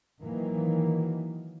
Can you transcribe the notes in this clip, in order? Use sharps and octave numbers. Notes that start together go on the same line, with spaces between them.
D#3 E3 F#3 A#3